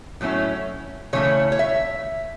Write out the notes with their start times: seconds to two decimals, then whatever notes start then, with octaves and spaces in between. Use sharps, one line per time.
0.21 A2 F#3 A3 C#4 E4
1.13 C#3 E3 A3 C#4 E4 C#5
1.52 C#5
1.59 E5